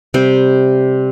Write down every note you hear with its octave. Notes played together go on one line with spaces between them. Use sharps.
C3 G3